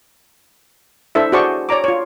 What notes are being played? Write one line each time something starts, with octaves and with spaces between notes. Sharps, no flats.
D4 E4 A4 C5 E5
F#4 G#4 C5 D5 A5 C#6
C#5 D5 A#5 D6
F4 C#5